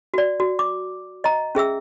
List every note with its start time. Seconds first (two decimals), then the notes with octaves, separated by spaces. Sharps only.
0.14 F#4 D5
0.40 F#4
0.59 D6
1.24 D#5 A#5
1.55 C#4 G#4 E5 E6